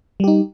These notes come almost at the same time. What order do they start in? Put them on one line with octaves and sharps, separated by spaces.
G3 G4 D#4